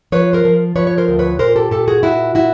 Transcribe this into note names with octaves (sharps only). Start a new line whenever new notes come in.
F3 B4 C#5
A#4 C5
F3
F3 B4 C#5
C#5
A#4 C5
D2
B4 C#5
A#2 A#4 C5
G4 A4
A#2 G4 A4
F#4 G#4
A#2 E4 F#4
A#2 E4 F#4